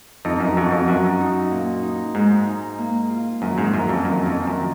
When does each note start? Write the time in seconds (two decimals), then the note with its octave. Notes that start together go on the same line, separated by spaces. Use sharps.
0.25 F2 D#4
0.40 F#2
0.57 F2 F#4
0.72 F2
0.88 F#2 F#4
1.21 D#4
1.51 A#2
1.83 D#4
2.15 G#2 G#3
2.46 D#4
2.78 A#3
3.10 F4
3.42 F#2 D#3
3.58 G#2
3.73 F#2 F4
3.89 F2
4.05 F#2 D#3
4.26 F2
4.36 D#3
4.47 F#2